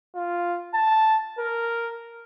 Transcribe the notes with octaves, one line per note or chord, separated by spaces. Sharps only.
F4
A5
A#4